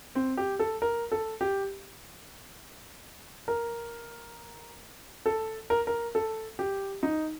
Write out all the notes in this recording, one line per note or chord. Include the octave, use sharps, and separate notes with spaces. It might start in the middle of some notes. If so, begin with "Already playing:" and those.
C4
G4
A4
A#4
A4
G4
A#4
A4
A#4
A#4
A4
G4
D#4